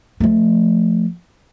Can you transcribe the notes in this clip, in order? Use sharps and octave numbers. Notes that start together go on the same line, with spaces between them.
F3 A3